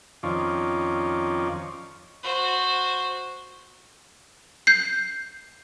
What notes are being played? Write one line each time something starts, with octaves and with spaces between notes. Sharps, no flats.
F2 D#3 F3 C#4 D5
F#4 C5
G6 C7